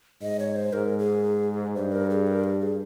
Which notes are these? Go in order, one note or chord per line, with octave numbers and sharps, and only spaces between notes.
G#2 D#5
C#5
C5
G#2 A#4
G#4
G2 C5
A#4
G#4
A#4
G4
G#4